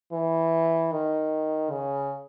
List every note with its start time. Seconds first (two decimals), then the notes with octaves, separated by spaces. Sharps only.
0.12 E3
0.92 D#3
1.71 C#3